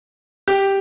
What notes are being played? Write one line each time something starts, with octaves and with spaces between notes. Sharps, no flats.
G4